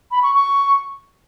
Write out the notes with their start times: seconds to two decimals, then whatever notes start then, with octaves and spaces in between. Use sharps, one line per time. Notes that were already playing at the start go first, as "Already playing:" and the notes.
0.11 B5
0.23 C#6
0.34 C#6